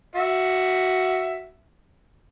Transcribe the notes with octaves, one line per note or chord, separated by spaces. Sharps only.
F#4 E5